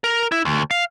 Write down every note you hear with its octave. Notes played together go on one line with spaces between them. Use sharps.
A#4
E4
D2
F5